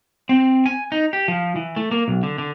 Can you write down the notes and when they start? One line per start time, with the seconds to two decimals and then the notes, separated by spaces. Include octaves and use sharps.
0.29 C4
0.66 G#5
0.92 D#4
1.13 G4
1.28 F3
1.56 E3
1.76 A3
1.91 A#3
2.08 B1
2.23 D3
2.38 D3